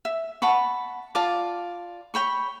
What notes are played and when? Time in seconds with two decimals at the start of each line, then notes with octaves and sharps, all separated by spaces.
0.05 E5
0.42 F#5 A5 B5 C#6
1.15 F4 D5 A5 D6
2.14 C#5 G5 B5 C#6